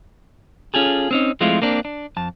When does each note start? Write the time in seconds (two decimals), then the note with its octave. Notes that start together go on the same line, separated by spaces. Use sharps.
0.74 C#4 F4 G#4 A4
1.11 C4 C#4 D#4
1.41 F3 G#3 A3 C4 E4 F4
1.62 A#3 C4 D4
1.85 D4
2.17 F2 A5